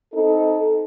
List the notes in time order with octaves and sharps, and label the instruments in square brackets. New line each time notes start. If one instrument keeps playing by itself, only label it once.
[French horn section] C4 D#4 A4